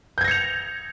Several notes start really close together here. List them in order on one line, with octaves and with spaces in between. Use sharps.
G6 G#6 A#6 C#7 F7